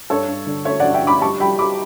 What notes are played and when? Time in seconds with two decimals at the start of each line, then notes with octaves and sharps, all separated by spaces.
0.10 G2 A4 C#5
0.28 G2
0.47 D3
0.65 A3 C#5 E5
0.80 D5 F#5
0.84 G2
0.94 E5 G5
1.03 G2 B5 D6
1.22 G3 A5 C#6
1.40 G3 G5 B5
1.59 G3 B5 D6